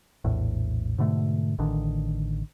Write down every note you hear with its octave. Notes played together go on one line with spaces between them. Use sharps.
A#1 E2 A2
G#2 B2 D3 A3
A1 D3 D#3 D4